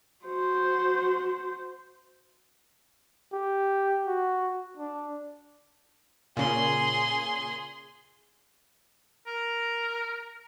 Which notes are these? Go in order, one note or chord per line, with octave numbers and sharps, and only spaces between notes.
F#4 C5
G4
F#4
D4
A#2 C#3 G#4 C6
A#4